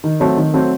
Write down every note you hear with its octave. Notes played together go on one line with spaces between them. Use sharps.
D#3
F#3 A3 C4
D#3
F#3 A3 C4